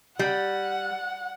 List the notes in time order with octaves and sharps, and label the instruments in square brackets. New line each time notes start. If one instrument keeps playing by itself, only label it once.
[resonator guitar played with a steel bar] G3 [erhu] F#5